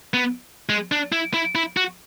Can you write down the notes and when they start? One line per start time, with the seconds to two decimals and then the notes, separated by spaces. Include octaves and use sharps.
0.14 B3
0.69 G#3
0.92 D4
1.12 E4
1.34 E4
1.55 E4
1.77 F#4